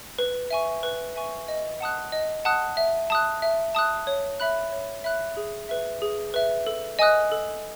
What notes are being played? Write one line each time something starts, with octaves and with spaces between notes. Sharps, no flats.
B4
E5 G#5 C#6
B4
E5 G#5 C#6
D#5
F#5 A5 D#6 F#6
D#5
F#5 A5 D#6 F#6
E5
A5 D#6 F#6
E5
A5 D#6 F#6
C#5
E5 B5 F#6
C#5
E5 B5 F#6
G#4
B4 E5
G#4
B4 E5
A4
D#5 G#5 D#6 F#6
A4